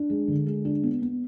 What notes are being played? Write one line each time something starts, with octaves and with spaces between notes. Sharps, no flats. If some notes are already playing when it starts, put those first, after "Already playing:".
Already playing: D4
G#3
D3
G#3
D4
B3
B3